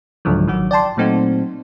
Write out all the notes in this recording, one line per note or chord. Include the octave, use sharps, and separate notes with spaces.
C#2 G#2 D3 F3 F#3
A1 D#3 F#3 F#4
D5 G5 A5 C6
A#2 F#3 A3 C4 D#4 F#4